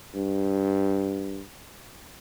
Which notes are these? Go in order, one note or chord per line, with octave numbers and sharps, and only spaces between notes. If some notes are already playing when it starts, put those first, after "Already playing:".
G2